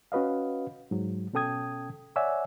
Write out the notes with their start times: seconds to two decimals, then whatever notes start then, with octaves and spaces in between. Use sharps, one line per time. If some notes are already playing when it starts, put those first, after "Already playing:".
0.12 C#4 F#4 B4 D#5 F5
0.91 G#2 F#3
1.33 B2 C#4 A4 G5 D#6 G#6
2.16 C#5 D5 E5 F#5 G#5 E6